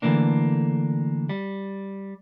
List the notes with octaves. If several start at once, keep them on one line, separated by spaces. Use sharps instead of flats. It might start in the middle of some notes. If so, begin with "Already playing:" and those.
D3 E3 A3 A#3 D4
G3